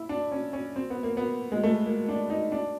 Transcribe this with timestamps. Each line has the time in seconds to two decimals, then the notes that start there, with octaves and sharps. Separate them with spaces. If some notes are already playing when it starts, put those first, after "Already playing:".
Already playing: E4
0.09 D4
0.32 C#4
0.53 C#4
0.76 C4
0.90 B3
1.03 A#3
1.17 B3
1.52 G#3
1.63 A3
1.86 A#3
2.09 D4
2.30 D#4
2.52 D4